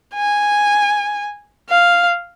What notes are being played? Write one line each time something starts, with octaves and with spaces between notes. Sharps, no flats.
G#5
F5